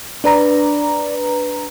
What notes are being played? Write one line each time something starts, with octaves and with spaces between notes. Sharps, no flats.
D4 B4 D5 A#5